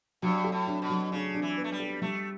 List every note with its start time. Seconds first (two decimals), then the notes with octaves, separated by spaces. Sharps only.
0.22 G2 F#3
0.44 A4
0.52 A2
0.67 D4
0.82 B2
0.90 F#3
1.11 C#3 D4
1.35 D4
1.42 E3
1.57 B3
1.64 A3
1.72 G3
1.80 A4
2.02 G3 A3